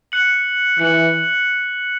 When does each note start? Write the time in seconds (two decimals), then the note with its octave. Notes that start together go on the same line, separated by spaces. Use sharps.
0.12 F#6 C#7 F#7
0.78 E3 F#6 C#7 F#7